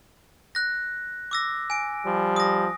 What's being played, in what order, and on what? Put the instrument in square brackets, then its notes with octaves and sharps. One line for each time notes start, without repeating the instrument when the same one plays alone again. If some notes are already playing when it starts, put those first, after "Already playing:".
[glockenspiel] F#6 A#6
D6 E6 A#6
G#5 D7
[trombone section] F3 G3
[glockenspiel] D#6 A#6